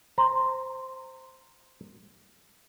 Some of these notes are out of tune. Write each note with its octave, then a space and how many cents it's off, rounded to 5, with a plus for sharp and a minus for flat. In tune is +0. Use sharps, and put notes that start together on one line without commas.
C5 +0 A#5 -15